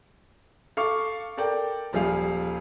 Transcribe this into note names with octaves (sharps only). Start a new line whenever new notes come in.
A4 F5 C#6 D6
A4 A#4 D5 G5
D#1 F3 G3 G#4 F5